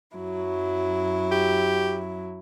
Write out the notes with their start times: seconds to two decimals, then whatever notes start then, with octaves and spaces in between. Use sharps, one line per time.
0.16 F#2 F#3 E4
1.32 G4